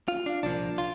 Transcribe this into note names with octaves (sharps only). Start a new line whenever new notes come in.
F4
D4
C2 A#2 F3 A#3 D4
F4